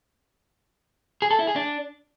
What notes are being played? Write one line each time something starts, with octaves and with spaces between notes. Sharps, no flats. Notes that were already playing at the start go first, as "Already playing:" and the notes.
G#4
A4
E4
G#4
D4